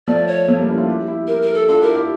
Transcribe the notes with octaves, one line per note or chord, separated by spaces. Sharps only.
F3 A3 D5
C#5
F3 A3
G3 A#3
C#4 E4
D4 F4
E4 G4
E4 G4
E4 G4 A#4
A#4
A4
D4 F4 A4
E4 G4 A#4
E4 G4